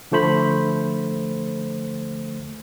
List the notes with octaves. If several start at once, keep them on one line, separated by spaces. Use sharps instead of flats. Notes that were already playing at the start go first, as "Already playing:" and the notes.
D3 F3 A3 C5 B5